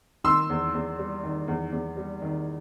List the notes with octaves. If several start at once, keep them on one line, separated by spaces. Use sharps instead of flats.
D#3 C6 E6
E2
E2
G3
D#3
E2
E2
G3
D#3